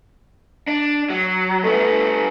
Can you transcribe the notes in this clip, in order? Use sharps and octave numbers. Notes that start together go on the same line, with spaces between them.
D4
F#3
G2 A3 B3